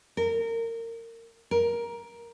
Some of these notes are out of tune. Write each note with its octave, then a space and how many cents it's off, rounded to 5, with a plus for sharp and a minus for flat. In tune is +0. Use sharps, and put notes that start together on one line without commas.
A#4 -25
A#4 +15